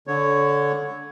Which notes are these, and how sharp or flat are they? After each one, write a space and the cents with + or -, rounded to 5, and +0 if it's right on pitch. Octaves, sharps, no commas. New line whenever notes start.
D3 -15 C#5 +0